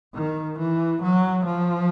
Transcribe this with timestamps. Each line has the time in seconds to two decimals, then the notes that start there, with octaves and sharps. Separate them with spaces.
0.15 D#3
0.59 E3
1.02 F#3
1.46 F3